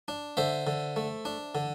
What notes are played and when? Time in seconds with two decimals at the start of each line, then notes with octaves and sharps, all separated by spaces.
0.08 D4
0.37 D3 C5 E5
0.67 D3
0.96 A3
1.25 D4
1.55 D3